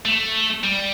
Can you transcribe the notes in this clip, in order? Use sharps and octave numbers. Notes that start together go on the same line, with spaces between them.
A3
G3